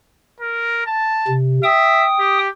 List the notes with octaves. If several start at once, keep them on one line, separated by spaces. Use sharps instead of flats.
A#4
A5
C3
E5 G5 D#6
G4